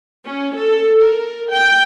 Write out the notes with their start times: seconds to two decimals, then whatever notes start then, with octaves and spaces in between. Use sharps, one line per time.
0.25 C#4
0.56 A4
1.01 A#4
1.50 G5